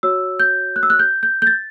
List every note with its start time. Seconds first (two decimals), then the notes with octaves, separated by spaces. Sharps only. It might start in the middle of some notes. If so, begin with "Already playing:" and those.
0.03 F#4 C#5 E6
0.40 G6
0.76 F#6
0.83 E6
0.90 F#6
0.99 G6
1.23 G6
1.42 G6
1.47 A6